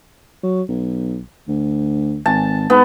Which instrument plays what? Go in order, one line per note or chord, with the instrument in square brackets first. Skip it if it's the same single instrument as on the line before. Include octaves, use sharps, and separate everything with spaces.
[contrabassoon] F#3
B1
D2
[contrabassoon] G#1 [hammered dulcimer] A5
[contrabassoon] G#2 [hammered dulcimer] B3